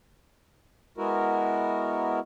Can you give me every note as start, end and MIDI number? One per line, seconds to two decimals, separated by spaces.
0.98 2.19 56
0.98 2.19 59
0.98 2.19 64
0.98 2.19 66
0.98 2.19 70